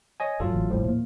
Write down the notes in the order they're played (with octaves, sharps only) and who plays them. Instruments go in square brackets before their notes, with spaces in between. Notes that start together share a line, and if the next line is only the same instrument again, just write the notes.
[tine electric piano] C#5 D#5 G#5
[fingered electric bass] F1 G#2 [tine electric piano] F#3 F4 A4
[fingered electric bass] G#1 A2 E3
[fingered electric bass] D#1 G#1 G3 [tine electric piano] D#2 A2 F3
[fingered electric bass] A#2 A#3